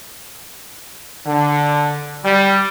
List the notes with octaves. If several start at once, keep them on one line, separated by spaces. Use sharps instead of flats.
D3
G3